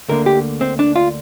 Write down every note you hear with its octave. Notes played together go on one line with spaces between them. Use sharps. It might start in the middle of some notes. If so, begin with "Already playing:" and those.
D2 D3 A#3 A#4
G4
C4
D4
F4